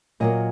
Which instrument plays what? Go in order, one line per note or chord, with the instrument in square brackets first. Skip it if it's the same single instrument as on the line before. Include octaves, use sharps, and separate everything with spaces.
[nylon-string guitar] A#2 F#3 A#3 D#5